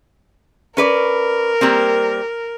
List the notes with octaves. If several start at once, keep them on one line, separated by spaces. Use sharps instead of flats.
C#4 A#4 B4 D5
G3 A#3 C4